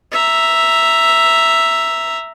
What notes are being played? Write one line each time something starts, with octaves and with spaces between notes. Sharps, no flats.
E5 A#5